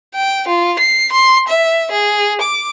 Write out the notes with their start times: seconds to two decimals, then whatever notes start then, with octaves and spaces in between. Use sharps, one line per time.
0.14 G5
0.48 F4
0.79 C7
1.12 C6
1.48 E5
1.91 G#4
2.41 D6